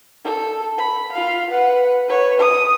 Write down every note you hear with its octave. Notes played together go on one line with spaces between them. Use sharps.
A4
B5
F4 F5
B4 F#5
B4 C#5
D#6